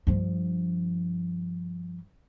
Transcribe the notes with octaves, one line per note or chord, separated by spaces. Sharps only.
G2 F3